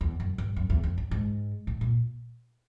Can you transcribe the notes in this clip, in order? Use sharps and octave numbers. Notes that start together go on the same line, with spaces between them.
E2
F#2
G2
F#2
E2
F2
G2
G#2
A2
A#2